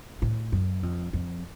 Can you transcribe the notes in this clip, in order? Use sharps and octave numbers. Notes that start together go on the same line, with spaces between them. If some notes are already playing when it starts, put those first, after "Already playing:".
A2
F#2
F2
F2